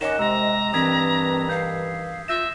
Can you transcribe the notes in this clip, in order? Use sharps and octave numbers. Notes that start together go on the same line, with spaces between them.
D#3 C#4 D#5 F#5 D6 E7
C3 G#3 A#5 E6 A#6
G2 D#3 E3 C4 D#6 G#6 B6
F5 G6 C7
F4 E5 G6 A#6 E7